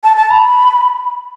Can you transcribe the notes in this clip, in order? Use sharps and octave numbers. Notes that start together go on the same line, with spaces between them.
A5
A5
B5